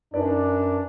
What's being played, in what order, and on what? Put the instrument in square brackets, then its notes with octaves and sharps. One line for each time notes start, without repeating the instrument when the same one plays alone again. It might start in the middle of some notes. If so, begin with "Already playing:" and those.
[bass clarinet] F#2 [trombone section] D4 [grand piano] D#4 B4 D5